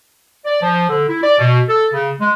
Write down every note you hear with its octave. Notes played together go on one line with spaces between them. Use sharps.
D5
F3
D3
E4
D5
B2
A4
C#3
G#3